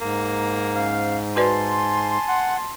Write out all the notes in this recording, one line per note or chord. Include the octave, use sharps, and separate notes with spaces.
G#2 A#3
C#4 C5 F5
F#4 B4 D5 G#5 A5 C6
F#5